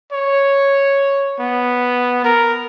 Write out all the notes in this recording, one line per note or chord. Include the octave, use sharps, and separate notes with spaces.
C#5
B3
A#4